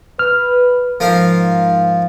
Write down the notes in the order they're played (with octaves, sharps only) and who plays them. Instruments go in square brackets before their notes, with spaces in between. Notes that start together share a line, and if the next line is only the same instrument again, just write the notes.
[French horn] B4 [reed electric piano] F6
[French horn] G#2 [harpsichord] F3 A#4 F5